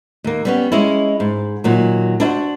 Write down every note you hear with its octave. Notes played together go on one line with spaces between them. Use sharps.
D#2 A#3
G3 B3 C#4
G#3 C#4 E4
G#2
A#2 D#3 F#3
D4 E4 F#4 C5